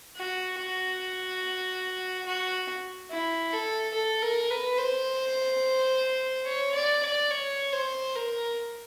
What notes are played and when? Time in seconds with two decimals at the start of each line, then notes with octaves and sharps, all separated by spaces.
0.17 F#4
0.59 F#4
2.26 F#4
3.11 E4
3.53 A4
3.94 A4
4.22 A#4
4.50 B4
4.78 C5
6.46 C#5
6.75 D5
7.03 D5
7.31 C#5
7.73 C5
8.16 A#4